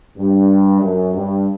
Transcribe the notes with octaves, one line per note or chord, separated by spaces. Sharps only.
G2
F#2
G2